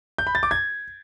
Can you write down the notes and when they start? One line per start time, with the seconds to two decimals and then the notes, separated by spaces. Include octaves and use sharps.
0.18 G6
0.27 B5
0.35 A6
0.43 D6
0.51 G#6